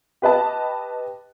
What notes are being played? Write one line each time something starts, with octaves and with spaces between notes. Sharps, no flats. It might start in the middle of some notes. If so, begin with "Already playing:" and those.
G4 B4 D#5 A5